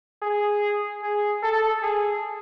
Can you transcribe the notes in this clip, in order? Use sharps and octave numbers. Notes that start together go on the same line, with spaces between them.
G#4
G#4
A4
G#4